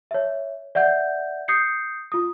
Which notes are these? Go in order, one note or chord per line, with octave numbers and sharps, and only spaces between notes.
C#5 E5
D5 E5 F#5 G6
D#6 G6 C7 C#7
F4 D#6